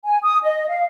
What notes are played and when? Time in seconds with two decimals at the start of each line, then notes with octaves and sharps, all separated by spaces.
0.05 G#5
0.23 D#6
0.42 D#5
0.69 F5